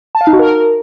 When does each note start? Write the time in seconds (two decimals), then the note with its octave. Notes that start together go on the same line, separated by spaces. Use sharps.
0.15 A5
0.21 F5
0.27 D#4
0.33 F#4
0.39 A#4